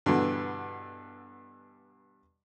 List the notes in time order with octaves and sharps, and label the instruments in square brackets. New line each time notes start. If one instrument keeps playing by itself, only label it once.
[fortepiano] G2 B2 D3 E3